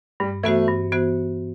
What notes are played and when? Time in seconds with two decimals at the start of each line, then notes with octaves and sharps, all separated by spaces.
0.20 G2 G3
0.43 E3 A3 B3 F#4 C5
0.68 G2
0.92 E3 B3 F#4 C5